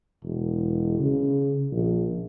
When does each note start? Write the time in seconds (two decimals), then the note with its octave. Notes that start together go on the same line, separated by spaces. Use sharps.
0.23 E1
1.00 C#3
1.72 A#1